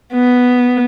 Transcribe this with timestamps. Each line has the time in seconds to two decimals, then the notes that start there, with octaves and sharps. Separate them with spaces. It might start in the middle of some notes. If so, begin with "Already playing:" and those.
0.13 B3